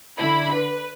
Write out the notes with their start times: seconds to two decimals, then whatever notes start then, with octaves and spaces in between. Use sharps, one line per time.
0.18 D3 E4 B5
0.54 B4